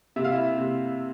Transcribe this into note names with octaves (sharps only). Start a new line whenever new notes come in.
C3 E5
F5
E4 E5
C3